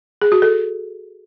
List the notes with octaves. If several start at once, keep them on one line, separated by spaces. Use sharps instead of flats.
G#4
F#4
A4